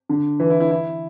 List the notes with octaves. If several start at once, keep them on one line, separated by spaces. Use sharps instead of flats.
D3
E3
E4
E4
E4